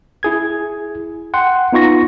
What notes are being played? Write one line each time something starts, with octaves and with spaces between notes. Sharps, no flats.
E4 G#4 G#6
F#5 G5 C6
B3 D#4 F4 C#6 A#6